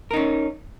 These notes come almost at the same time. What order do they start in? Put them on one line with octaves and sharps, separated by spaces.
A#4 D#4 C#4